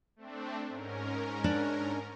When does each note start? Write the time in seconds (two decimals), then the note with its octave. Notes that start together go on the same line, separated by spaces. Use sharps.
0.16 A3 C4 D4
0.68 G#2 C#4 A#4
1.44 D4